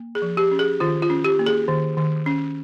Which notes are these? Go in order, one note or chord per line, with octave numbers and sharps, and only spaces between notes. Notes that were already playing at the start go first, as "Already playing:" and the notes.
Already playing: A#3
G#4
F3
G4
C#4
G#4
D#3 F4
F4
C#4
G4
A#3
G#4
D#3
D#3
C#4